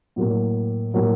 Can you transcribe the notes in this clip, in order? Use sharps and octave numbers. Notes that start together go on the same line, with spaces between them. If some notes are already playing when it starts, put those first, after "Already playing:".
A2 F#3 A#3
A2 F#3 A#3